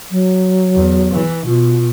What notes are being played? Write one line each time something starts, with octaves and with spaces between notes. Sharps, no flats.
F#3
E2
E3
B2 F4